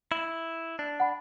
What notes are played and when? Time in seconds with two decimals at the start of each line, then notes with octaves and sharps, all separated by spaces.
0.12 E4
0.79 D4
1.00 F#5 B5